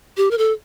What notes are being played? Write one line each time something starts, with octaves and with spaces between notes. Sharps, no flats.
G4
A#4
A4